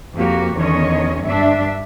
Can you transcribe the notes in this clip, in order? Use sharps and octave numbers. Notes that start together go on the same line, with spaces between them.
F2 A#3 F#4 G4
E2 D3 D#3 C#4 C#5 D#5
G2 D4 E5